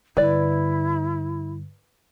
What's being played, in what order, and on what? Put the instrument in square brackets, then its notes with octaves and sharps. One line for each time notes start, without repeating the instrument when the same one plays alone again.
[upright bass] G2 D3 [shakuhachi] E4 [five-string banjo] B4 D5